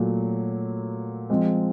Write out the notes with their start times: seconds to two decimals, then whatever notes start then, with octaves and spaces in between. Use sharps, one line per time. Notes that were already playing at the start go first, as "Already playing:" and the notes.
Already playing: A#2 F#3 A3
1.30 F3 G#3 C4